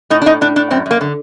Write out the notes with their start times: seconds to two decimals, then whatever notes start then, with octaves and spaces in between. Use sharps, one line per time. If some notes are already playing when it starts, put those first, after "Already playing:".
0.10 A2 D#4
0.22 D4
0.26 A2 D#4
0.41 A2 D4
0.56 A2 D4
0.71 F#2 C4
0.86 F#2 A#3
1.01 D3